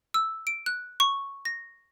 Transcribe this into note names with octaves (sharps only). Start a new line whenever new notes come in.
E6
D7
F#6
C#6
A#6